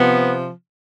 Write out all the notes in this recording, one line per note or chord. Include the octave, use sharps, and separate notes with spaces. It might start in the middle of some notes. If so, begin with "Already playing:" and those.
Already playing: C3 F3 B3